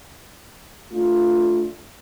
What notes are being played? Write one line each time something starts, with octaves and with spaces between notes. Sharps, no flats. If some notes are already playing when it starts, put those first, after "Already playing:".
A3 D4 F4